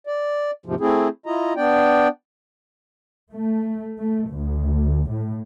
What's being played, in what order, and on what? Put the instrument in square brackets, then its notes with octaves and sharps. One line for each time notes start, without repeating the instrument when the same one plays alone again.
[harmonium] D5
D#2 G#2 C3 F3
A3 C4 E4 G#4
E4 F4 D#5 A#5
B3 D4 D5 G5
[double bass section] A3
A3
D2
A2